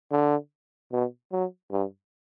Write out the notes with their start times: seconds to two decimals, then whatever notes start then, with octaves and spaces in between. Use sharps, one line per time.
0.11 D3
0.92 B2
1.32 F#3
1.72 G2